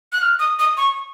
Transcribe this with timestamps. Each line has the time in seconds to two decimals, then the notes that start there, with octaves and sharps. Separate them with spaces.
0.12 F#6
0.21 F6
0.39 D#6
0.59 D#6
0.77 C#6